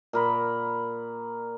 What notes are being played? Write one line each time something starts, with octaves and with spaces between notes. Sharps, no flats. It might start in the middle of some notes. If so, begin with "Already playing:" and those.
A#2 A#4 B5